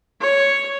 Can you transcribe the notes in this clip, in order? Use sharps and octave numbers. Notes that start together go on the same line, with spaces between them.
C#5